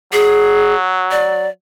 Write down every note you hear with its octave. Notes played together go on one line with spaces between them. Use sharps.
F#3 G#4
D5